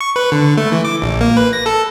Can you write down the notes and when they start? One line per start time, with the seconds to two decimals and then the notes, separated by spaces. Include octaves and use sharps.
0.01 C#6
0.16 B4
0.32 D3
0.57 A3
0.72 E3
0.85 D6
1.02 A#1
1.21 A#3
1.37 B4
1.53 A#6
1.66 A4